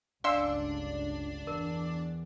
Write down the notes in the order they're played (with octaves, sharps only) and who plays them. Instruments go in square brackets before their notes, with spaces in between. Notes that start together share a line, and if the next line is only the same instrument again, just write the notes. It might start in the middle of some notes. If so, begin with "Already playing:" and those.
[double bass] G1 C#2 [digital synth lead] D4 [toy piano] D5 F5 G#5 [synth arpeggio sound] C6 E6
[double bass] E2 [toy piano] A#4